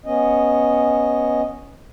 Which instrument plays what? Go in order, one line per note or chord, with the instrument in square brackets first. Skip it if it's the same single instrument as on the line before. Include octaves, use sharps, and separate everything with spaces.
[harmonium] B3 C#4 D#5